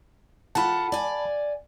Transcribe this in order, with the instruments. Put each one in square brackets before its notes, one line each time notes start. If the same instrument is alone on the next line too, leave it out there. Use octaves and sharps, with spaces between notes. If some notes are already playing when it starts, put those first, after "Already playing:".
[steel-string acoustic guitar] F4 A4 F#5 [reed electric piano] A5 B5
[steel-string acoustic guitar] D5 G#5